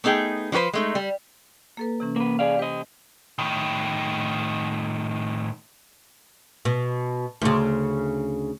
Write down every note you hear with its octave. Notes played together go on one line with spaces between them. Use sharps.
A3 B3 D#4 G#4 G5
F3 D#4 F#4 B4 C5
G#3 A3 D#4
G3
A#3 A4 B4
C3 E3 C#4
A#3 B4
G#4 D5 F5
G4 C5 D#5
A2 D#3
B2
D2 C#3